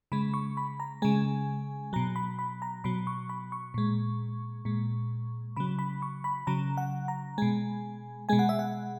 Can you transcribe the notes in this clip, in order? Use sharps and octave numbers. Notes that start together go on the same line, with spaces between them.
C#3 G#3 B5
C#6
B5
A#5
C#3 G#3 G#5
B2 F#3 A#5
B5
B5
A#5
B2 F#3 B5
C#6
B5
C#6
A#2 G#3
A#2 G#3
C#3 F#3 B5
B5
C#6
B5
C#3 F#3 A#5
F#5
A#5
B2 G#3 G#5
B2 G#3 G#5
F#5
E5
F#5